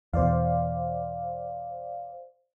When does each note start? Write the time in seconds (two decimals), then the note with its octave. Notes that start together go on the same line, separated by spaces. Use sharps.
0.13 E2 B2 C5 D5 F5